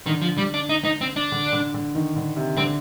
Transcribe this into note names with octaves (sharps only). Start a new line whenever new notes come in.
D3 D#3
F3
G3
D4
D#4
D#4
C4
D4
D3
D3
D3
D#3
D3
C3
D3 C4